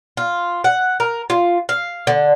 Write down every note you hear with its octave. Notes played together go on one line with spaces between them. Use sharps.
F4
F#5
A#4
F4
F5
D3